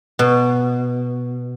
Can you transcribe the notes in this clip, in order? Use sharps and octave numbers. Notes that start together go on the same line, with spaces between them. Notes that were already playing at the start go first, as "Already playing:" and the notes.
B2